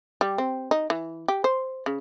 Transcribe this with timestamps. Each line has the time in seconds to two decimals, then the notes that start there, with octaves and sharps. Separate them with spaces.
0.21 G3
0.38 C4
0.71 D#4
0.90 E3
1.28 G4
1.44 C5
1.86 C#3